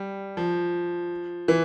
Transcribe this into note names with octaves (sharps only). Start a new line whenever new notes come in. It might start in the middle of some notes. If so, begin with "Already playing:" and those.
Already playing: G3
F3
E3